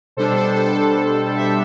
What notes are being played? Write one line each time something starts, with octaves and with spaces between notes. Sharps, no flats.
B2 G3 D4 A4 C5
A4 C5
A4 C5
C5 E5